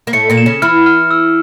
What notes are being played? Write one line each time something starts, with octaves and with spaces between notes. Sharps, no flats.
A#3
A2 A3 C#7
A#2 A#3
E7
C#3 C#4
E3 E4 F6
F6
E6